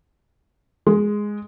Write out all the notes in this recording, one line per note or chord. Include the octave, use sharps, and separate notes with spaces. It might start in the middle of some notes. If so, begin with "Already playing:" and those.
G#3